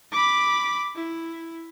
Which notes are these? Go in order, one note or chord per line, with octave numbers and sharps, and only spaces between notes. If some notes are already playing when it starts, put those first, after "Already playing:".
B5 D6
E4